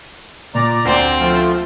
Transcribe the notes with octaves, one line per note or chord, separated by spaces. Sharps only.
A#2 D5 A#5
D2 C4 C7
F3 A3 F4